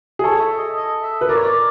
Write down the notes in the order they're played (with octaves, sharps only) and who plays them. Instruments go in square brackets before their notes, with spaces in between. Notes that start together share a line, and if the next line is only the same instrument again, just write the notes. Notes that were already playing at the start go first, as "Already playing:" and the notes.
[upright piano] G#4
[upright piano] A4 [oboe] C#5
[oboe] E5
D#5
D#5
E5
[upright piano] B4
[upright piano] A#4 [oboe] D5
[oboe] C#5
D5